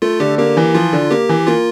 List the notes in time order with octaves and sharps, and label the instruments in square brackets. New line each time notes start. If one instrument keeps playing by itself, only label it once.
[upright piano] A3 [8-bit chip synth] F4
[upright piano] D3 [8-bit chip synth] G4
[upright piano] A#3 [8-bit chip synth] G4
[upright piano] E3
[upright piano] F3 [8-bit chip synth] F4
[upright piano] D3
[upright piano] A#3 [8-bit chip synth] G4
[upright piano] E3
[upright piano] A#3 [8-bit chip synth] F4